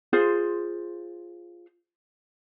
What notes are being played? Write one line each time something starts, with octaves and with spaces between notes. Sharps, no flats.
F4 G#4 C5